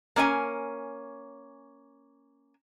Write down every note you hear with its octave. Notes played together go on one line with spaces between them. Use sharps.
A#3 C#4 D5 G#5